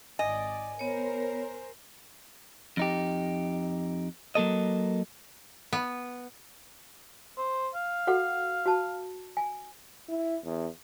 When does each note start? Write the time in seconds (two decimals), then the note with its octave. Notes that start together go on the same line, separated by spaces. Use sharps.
0.19 G#1 D5 D#5 G#5
0.79 B3 A#4 C5 C#5
2.77 F2 D#4 G4
4.35 F#3 A#3 A4 D#5
5.73 B3
7.37 C5
7.75 F5
8.07 F#4 A4 F#5
8.66 F#4 A5
9.37 G#5
10.09 E4
10.44 E2